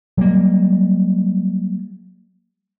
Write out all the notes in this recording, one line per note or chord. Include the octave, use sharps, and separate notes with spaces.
F#3 G3 A#3